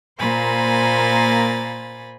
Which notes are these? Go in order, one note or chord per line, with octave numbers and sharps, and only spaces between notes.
A#2 A#3 C5 G#5 B5 A6